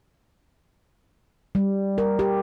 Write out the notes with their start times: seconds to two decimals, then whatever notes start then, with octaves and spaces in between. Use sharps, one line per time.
1.55 G3
1.98 A#4
2.19 G4